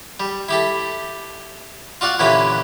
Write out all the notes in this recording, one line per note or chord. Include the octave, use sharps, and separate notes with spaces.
G3
E4 G4 A4
F4 F#4 D5 F5 F#5
A#2 D3 E3 C#4 E4 G4